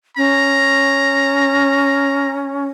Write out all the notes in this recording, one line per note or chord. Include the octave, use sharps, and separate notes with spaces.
C#4 A#5